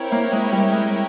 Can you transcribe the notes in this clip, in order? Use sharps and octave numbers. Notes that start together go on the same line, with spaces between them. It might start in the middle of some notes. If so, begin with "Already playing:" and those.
Already playing: C4 E4 A#4 C#5 G5
A#3
G#3
G3
G#3